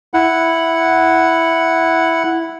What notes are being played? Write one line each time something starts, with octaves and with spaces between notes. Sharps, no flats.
E4 F#5